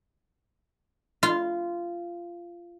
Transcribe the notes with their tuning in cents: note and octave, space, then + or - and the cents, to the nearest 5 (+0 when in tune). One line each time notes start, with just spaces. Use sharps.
F4 -15